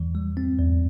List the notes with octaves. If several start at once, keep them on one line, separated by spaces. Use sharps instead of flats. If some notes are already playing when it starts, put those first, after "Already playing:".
Already playing: E2 E3
G3
C4
E2